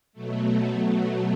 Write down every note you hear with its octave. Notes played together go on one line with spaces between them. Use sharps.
B2 F#3 A3